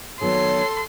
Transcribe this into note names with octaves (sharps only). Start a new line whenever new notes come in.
D#3 F#3 B3 A4 C#5 C6